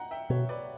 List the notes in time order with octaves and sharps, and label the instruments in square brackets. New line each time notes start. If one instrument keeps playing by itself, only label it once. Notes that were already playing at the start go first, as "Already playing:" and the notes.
Already playing: [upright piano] F#5 G5 A#5
E5 G5
[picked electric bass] B2 [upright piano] C#5
[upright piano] B4 D5